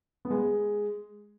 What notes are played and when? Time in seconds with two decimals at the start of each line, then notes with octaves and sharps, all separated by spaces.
0.25 B3
0.30 G#3